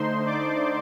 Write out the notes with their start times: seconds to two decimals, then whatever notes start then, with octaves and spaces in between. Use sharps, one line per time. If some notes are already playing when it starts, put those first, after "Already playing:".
Already playing: D3 A3 D#4 C5 C6
0.26 D5 D6